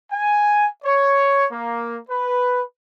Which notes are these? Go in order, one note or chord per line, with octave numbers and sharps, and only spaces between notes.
G#5
C#5
A#3
B4